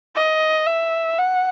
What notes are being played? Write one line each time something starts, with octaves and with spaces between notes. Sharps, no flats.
D#5
E5
F#5